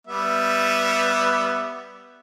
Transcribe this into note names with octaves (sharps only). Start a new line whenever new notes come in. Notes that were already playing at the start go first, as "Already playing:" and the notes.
G3 B3 E5